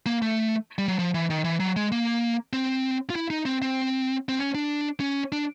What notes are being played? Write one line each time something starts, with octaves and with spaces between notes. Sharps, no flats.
A#3
A3
G3
F#3
F3
E3
D#3
E3
F#3
G#3
A#3
C4
F4
E4
D#4
C4
C4
C4
C#4
D4
C#4
D4